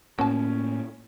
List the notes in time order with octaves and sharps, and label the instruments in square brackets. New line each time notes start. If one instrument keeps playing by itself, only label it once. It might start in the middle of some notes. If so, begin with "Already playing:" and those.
[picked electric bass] A2 A#3 [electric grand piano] C#4 [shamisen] F#4 A5